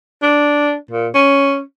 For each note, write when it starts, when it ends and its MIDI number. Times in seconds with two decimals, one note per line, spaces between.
0.23 0.76 62
0.91 1.08 46
1.15 1.61 61